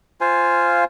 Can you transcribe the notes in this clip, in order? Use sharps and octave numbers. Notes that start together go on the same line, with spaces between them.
F4 C5 F5 G#5